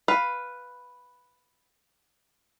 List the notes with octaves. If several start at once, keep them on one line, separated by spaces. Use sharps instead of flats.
B4 F5